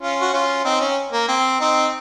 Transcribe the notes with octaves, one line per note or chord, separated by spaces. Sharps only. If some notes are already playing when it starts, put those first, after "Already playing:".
C#4 F4
F#4
C#4 F4
C4 D#4
C#4
A#3
C4
C4 D#4